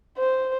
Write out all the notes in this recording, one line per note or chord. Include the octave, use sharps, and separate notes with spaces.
C5